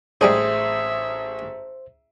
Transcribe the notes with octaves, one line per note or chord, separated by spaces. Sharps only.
A1 G3 G#3 D4 G#4 C5 E5